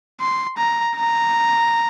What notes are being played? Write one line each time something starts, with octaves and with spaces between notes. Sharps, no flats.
C6
A#5
A#5